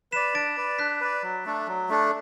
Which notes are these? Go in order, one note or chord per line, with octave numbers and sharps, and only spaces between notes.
B4 D5 B6 E7
D4 A6 D7
B4 D5
D4 F#6 B6
B4 D5
F#3
A3 D4 A4
F#3
A3 D4 A4